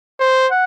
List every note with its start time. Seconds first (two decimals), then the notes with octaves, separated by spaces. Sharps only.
0.20 C5
0.51 F#5